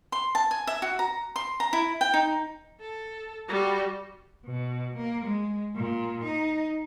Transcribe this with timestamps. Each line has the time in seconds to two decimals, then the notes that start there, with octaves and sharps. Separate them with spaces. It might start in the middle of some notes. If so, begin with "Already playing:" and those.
0.12 C6
0.35 A5
0.51 G#5
0.67 E5
0.82 F#4
0.99 A#5
1.36 C6
1.60 A#5
1.73 E4
2.01 G5
2.14 D#4
2.80 A4
3.48 G3 F#4
4.46 B2
4.96 A#3
5.26 G#3
5.76 A#2
6.26 D#4